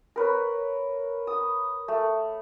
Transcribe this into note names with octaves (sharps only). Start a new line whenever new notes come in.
A#4 B4 C#5
D#6
A3